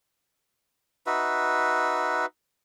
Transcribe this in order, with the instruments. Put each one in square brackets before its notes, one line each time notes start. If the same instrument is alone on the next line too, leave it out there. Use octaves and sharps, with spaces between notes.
[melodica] D#4 F#4 B4 E5